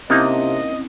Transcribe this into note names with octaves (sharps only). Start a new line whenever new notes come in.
C3 A#3 C4 C#4 D#4 E4 D#5